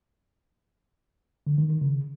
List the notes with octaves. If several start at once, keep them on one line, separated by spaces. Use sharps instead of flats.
D3
D#3
D#3
C#3